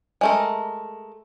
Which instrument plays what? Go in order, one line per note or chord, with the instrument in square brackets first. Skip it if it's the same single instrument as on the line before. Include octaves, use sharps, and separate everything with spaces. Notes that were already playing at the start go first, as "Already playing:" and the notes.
[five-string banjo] G#3 A3 A#4